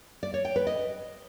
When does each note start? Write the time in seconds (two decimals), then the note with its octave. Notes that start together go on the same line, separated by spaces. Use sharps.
0.23 D5
0.34 C#5
0.45 G5
0.56 B4
0.67 D#5